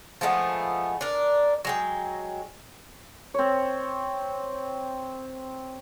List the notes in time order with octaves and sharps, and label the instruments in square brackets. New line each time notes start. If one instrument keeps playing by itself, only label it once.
[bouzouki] F3 G#3 A3 B3
D4 A#4
F#3 G#3 G5
[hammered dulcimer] C4 C#5